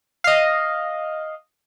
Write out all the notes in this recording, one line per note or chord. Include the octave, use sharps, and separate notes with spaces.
D#5 F5